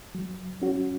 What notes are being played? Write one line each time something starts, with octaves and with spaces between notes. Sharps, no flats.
F#3
C#4 F#4